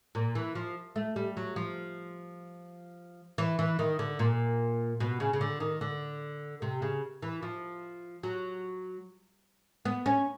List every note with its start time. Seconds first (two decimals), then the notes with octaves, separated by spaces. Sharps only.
0.15 A#2
0.35 E3
0.55 F3
0.96 A3
1.16 G3
1.37 F#3
1.56 F3
3.38 E3
3.59 E3
3.79 D#3
3.99 D3
4.19 A#2
5.00 B2
5.20 C#3
5.33 C#3
5.41 D3
5.60 D#3
5.81 D3
6.62 C3
6.82 C#3
7.22 E3
7.43 F3
8.23 F#3
9.85 B3
10.06 C#4